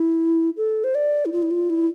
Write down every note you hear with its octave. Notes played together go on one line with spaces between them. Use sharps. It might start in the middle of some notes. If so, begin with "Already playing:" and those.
Already playing: E4
A4
C5
D5
E4
F4
E4
F4
E4